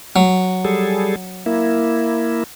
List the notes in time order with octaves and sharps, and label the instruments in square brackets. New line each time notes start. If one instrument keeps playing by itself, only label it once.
[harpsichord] F#3
[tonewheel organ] G3 G#4 A4
A#3 E4